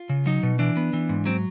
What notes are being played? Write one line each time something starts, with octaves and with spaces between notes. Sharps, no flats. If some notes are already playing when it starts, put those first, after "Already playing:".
Already playing: F4
C#3
F#3 D#4
B2
E3 D4
B3
E3
G#2
F#3 C4